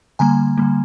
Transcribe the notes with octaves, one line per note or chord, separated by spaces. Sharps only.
D3 G3 A#3 G#5 A#5
D3 G3 A#3